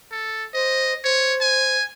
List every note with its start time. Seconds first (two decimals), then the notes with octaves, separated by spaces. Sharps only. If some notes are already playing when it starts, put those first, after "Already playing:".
0.12 A4
0.54 C5 D#5
1.04 C5 C#5
1.41 G#5